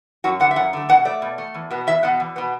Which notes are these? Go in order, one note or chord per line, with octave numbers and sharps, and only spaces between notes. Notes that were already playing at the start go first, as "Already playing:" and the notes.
F#2 F#4
D3 A3 F#5
E5
F#2 F#5
D3 A3
B2 F#5
A3 D5
B2
A3
E2
B2 B3
E2 E5
B2 B3 F#5
E2
B2 B3